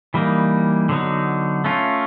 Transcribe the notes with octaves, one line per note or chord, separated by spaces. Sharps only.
E3 G3 A#3 D#4
D3 F#3 B3 D#4
A3 C#4 F4